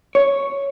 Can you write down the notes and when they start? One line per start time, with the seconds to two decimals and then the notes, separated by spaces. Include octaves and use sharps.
0.15 C#5